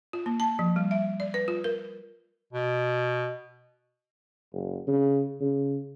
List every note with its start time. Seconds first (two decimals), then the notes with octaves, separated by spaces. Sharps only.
0.13 F4
0.26 A#3
0.40 A5
0.59 F3
0.76 G3
0.91 E5
1.20 D5
1.34 B4
1.48 F4
1.64 A#4
2.53 B2
4.53 F#1
4.87 C#3
5.40 C#3